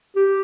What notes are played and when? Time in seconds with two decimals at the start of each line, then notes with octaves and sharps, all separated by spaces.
0.16 G4